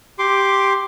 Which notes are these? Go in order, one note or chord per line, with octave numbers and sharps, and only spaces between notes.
G4 C6 D6